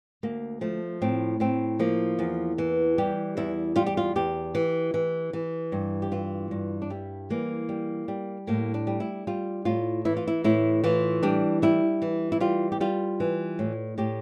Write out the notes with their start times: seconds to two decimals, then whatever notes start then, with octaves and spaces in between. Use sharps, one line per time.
0.23 D2 A#3
0.61 F3 A3
1.02 A2 C4
1.40 A2 C4
1.79 F3 A#3
2.19 E2
2.58 E3
2.98 G3 G4
3.37 E2 E4
3.76 G3 F4
3.86 G4
3.97 F4
4.16 E2 G4
4.55 E3
4.94 E3
5.33 E3
5.72 G2
6.02 G4
6.12 E3 F4
6.51 G2
6.82 D4
6.90 G3 E4
7.30 E3 A#3
7.69 G3
8.08 G3
8.47 A2 A#3
8.74 D4
8.87 G3
9.00 E4
9.27 G3 F4
9.65 A2 F4
10.05 E3 E4
10.17 F4
10.27 E4
10.44 A2 E4
10.84 E3 F4
11.23 G3 D4
11.62 G3 E4
12.02 E3
12.32 E4
12.40 G3 F4
12.72 G4
12.81 G3 F4
13.20 E3
13.59 A2
13.98 A2 G4